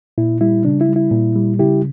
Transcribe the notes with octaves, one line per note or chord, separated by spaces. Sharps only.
A#2 E4
G3 E4
C#3 D4
E4
G3
E4
A#2
G3
C#3 E4 G4